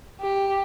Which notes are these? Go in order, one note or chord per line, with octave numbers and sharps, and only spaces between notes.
G4